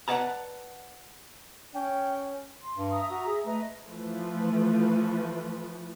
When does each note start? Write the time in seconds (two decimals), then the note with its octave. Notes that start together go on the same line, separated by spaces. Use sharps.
0.08 B4 D5 F5 F#5 A5 A#5
1.74 C#4 G5
2.62 C6
2.77 G2
2.92 E5 A#5 D#6
3.11 F#4
3.27 G#4
3.46 A3 B4 D#5 A#5
3.86 E3 F3 A3 B4